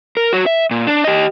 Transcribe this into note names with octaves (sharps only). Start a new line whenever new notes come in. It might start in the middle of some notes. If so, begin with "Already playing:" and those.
A#4
F#4 C#5
E5
A#2
D4
G4 D#5